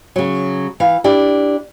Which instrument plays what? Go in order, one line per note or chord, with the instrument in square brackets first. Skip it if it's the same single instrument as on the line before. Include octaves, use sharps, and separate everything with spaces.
[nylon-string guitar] C#3 F#3
E3 F5
D4 E4 G4